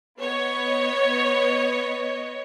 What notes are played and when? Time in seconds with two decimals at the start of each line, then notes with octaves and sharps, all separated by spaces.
0.20 B3 C#5 D#5